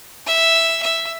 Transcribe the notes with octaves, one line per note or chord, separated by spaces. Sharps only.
E5
E5